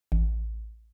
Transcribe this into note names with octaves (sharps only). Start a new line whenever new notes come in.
A1